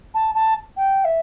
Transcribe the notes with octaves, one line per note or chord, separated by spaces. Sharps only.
A5
A5
G5
E5